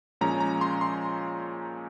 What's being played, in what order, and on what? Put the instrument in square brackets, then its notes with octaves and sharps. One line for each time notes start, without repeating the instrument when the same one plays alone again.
[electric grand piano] A#2 F3 G#3 C#4 A#5
A#5
C6
C6